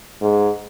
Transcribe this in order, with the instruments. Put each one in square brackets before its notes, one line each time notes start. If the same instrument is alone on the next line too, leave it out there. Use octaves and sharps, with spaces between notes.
[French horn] G#2